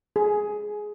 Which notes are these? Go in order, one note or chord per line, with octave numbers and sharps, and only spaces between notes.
G#4